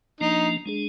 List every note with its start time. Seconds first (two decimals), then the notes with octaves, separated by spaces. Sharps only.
0.21 F3 A#3 D4 D#4
0.66 G#3 D4 G#4